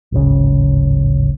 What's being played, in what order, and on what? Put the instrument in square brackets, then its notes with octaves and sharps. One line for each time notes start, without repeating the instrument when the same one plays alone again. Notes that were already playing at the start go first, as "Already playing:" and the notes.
[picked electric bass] D1 G#1 C#3